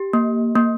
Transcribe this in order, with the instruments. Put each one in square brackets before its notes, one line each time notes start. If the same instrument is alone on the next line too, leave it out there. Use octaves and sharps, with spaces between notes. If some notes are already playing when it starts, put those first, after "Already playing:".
Already playing: [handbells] G4
A#3
A#3